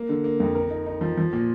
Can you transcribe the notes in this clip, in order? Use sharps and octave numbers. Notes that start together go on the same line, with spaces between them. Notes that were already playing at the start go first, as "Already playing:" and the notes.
Already playing: A#3
D3
A#3
F2
A#4
D#4
D#4
F3
F3
A#2